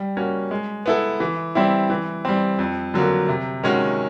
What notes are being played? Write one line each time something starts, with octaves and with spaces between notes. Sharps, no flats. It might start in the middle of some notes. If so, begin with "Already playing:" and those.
Already playing: G3
A#3 C#4 F#4
G#3
B3 E4 A4
E3
G3 C4 E4
E3
G3 C4
F2
D3 F#3 A#3
C3
D#3 G#3 C#4 F#4